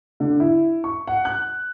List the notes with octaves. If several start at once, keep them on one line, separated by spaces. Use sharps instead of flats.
D3
E4
C#6
F#5
F#6